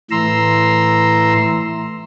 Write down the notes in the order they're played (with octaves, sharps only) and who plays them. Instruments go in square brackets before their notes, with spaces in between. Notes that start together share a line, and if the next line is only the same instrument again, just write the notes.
[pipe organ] A2 E3 A#5 C6 E6